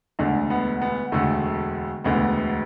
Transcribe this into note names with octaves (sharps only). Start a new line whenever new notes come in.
E1 D2 D3 D4
B3
B3
E1 D2 D3 A3
E1 D2 D3 B3